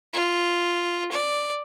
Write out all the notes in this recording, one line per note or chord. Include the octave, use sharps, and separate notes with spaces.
F4
D5